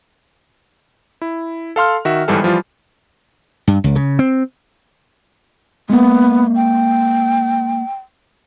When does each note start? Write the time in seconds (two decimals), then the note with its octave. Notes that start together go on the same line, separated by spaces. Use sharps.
1.22 E4
1.76 A4 F5 C6 F6
2.05 D#3 F#4 E5
2.28 G1 G#2 E3 G3 G#4 A4
2.43 E3 F3 G3 F4
3.67 G2
3.84 C#2
3.96 C#3
4.19 C4
5.89 G#3 A#3 B3
6.55 G5